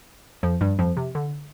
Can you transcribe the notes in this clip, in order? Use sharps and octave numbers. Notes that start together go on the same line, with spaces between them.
F2 F3
G2 G3
F2 F3
C3
D3